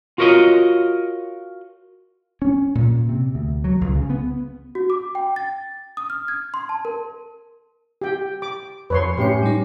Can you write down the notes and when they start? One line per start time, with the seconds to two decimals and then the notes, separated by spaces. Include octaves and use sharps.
0.18 F4 F#4 A#4 C#5 D#5
2.42 C#4
2.75 A#2
3.09 C3
3.35 D2
3.64 F#3
3.81 C#2
3.95 C#3
4.10 B3
4.75 F#4
4.90 D6
5.15 G5
5.36 A6
5.97 D#6
6.10 F6
6.28 G#6
6.54 C6
6.69 A5
6.85 A#4
8.01 G4 G5
8.42 D6
8.90 F2 B4 C#5 C6
9.17 A2 C#4 G4 C6 C#7
9.43 G3 D#4